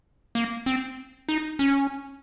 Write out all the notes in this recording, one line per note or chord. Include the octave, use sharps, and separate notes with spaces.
A#3
C4
D#4
C#4